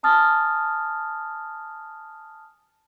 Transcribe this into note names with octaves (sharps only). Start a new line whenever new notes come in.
G#5 A5 D#6 F6 A6